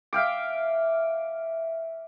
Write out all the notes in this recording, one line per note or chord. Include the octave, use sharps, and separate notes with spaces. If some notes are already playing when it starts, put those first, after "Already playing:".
E5 F5 G5 D6